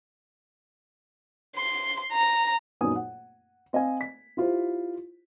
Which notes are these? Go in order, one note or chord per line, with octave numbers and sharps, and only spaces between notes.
C6
A#5
A#1 F#2 B3 D#4 G#5 D#6
F#5
C4 D#5 F5 G#5
B6
E4 F4 G4 C5